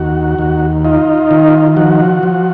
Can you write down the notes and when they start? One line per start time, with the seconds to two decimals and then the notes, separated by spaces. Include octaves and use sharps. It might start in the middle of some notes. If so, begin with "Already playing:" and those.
Already playing: D#2 F#4
0.39 D#2
0.85 D#4 F4
1.31 D#3
1.76 F3 F#4
2.23 F3